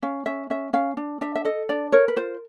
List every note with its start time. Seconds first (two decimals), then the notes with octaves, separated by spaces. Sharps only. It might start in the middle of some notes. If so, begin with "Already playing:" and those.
0.02 C#4 F5
0.26 C#4 E5
0.50 C#4 E5
0.73 C#4 F5
0.97 D4
1.21 D4 E5
1.35 E5
1.45 A4 D#5
1.69 D4 D5
1.92 A#4 C#5
2.08 B4
2.16 F4 C5